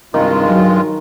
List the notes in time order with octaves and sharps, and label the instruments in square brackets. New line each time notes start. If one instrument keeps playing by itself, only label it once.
[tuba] C2 [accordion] G2 G#3 F4 [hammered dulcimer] D#3
[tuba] F#3